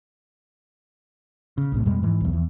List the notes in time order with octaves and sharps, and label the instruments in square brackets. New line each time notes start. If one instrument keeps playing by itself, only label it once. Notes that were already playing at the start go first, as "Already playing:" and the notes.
[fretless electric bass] C#3
A#1 A2 C3
F2 B2 G3 G#3
G#2 E3
B1 E2
E2